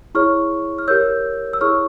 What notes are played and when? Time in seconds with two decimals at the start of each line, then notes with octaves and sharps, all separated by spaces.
0.15 E4 G#4 C#5 C#6 F6
0.79 F6
0.88 G4 A#4 C#5 E6 G6
1.53 E6
1.61 E4 G#4 C#5 C#6 F6